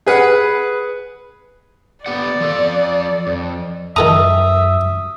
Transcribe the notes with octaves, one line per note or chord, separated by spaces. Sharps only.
G#4 B4 F#5
B3 G4 D5 F#5
F3 F4 A4
F2
F#2 D#3 A4 E5 A#5 D#6